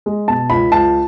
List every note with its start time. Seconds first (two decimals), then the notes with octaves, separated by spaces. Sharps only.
0.06 G#3
0.28 B2 A5
0.50 C#2 B5
0.72 C#2 A5